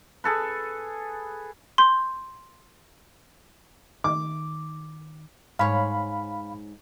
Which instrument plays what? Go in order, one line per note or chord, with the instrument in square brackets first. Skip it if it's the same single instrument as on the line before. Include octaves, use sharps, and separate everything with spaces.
[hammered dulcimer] G#4 A4 B4
[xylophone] C6 G6
[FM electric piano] D#3 [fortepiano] D6
[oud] G#2 C#5 [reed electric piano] F5 B5